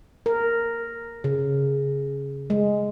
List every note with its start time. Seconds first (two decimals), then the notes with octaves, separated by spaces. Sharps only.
0.26 A#4
1.24 C#3
2.50 G#3